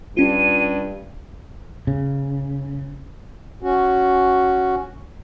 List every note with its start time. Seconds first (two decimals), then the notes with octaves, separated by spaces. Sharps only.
0.17 G2 C#4 F4 D#7
1.87 C#3
3.63 C#4 F#4